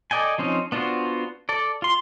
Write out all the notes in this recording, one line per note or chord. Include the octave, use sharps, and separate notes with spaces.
A4 D5 D#5 G5 G#5
F3 C4 C#4 D#4
B3 D4 F4 F#4 C5
A4 D5
F4 C6